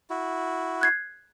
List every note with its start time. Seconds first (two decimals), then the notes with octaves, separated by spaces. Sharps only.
0.10 E4 F#4
0.81 F#6 G#6 C7